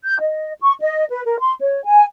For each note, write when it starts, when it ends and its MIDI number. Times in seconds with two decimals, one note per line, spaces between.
0.05 0.17 91
0.20 0.51 75
0.61 0.74 85
0.81 1.04 75
1.10 1.23 71
1.26 1.37 70
1.40 1.54 84
1.60 1.81 73
1.85 2.04 80